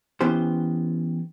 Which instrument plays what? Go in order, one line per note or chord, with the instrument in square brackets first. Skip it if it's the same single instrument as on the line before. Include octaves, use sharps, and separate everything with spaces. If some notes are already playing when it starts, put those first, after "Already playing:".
[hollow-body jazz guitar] E3 B3 C#4 G4 C5